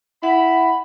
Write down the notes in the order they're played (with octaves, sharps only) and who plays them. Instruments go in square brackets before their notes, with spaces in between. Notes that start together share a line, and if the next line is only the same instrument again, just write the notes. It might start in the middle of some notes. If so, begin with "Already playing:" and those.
[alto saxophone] E4 [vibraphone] F#5 [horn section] B5